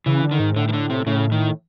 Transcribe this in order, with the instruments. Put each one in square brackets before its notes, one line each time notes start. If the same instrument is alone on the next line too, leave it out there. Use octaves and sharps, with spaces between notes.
[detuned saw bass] C#3 [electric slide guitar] E3
[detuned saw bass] D3
[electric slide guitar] D#3
[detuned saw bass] G#2
[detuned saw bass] A2 [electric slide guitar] D3
[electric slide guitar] D#3
D3
C3
[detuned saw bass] A2 [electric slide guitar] C#3
[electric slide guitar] D#3